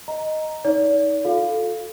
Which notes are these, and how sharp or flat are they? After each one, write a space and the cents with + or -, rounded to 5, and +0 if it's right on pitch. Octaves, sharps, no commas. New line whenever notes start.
D#5 +0 A#5 +0
D#4 +30 D5 -45
F4 +45 A4 -5 F5 +0